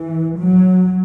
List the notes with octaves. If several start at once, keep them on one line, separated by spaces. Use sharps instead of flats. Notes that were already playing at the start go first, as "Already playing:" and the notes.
Already playing: E3
F#3